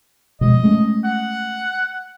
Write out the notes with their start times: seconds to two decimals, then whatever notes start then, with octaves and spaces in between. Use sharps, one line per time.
0.41 B2 F3 G#3 D#5
0.63 G#3 A3 C#4
1.04 F#5